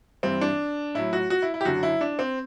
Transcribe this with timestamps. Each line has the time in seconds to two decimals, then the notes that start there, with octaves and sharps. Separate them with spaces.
0.23 G2 E3 G3 C4
0.41 D4
0.95 A2 F#3 E4
1.13 F#4
1.30 F#4
1.42 E4
1.54 E4
1.61 G4
1.65 F#2 D3 F#3 F#4
1.83 E4
2.01 D4
2.19 C4